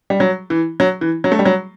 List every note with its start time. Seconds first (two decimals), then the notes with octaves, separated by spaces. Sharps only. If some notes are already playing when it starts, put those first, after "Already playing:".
0.10 G3
0.20 F#3
0.50 E3
0.80 F#3
1.01 E3
1.24 F#3
1.32 A3
1.39 G3
1.46 F#3